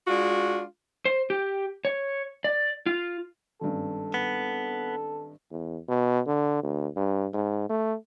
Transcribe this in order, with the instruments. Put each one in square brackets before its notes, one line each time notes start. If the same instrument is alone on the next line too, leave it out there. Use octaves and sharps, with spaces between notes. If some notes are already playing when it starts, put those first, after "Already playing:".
[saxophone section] G#3 D4 F4 F#4
[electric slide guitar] C5
G4
C#5
D5
F4
[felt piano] G#1 G2 C#4 [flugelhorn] A4
[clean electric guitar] B3
[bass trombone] E2
B2
D3
D2
G2
G#2
A3